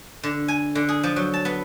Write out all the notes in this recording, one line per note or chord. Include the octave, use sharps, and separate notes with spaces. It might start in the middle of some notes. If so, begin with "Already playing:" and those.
D3
G#5
D3
G#4
F3
F#3
A5
B3